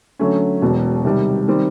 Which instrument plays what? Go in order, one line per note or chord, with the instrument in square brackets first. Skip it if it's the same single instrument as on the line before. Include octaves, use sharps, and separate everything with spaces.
[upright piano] D3 F#3 A3 C#4
E1 E2 B2
C3 D#3 G3
D#3 G3 C4